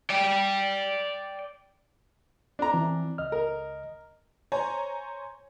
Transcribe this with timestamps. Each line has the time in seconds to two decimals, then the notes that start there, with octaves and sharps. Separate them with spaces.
0.10 D5 G5
2.59 D4 A#5
2.73 E3 C4
3.18 C#2 D#5 F6
3.32 A#4
4.52 C5 C#5 G#5 A#5